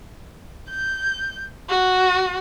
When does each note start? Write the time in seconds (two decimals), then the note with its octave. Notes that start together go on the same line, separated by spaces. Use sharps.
0.70 G6
1.70 F#4